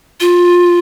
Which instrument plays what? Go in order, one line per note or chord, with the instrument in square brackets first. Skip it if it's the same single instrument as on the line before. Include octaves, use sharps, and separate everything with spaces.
[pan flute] F4